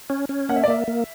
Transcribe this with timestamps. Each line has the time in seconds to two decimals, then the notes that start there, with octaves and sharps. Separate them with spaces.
0.10 C#4
0.29 C#4
0.49 A#3 F#5
0.56 E5
0.64 D5
0.68 A#3 E5
0.88 A#3